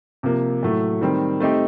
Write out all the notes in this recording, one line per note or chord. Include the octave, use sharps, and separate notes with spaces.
C3 F3 A#3
A2 F#3 A3
D#3 G3 C4
A3 C4 D#4 G4